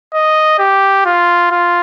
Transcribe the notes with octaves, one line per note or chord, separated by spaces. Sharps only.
D#5
G4
F4
F4